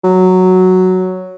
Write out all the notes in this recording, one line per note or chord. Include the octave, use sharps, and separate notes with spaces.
F#3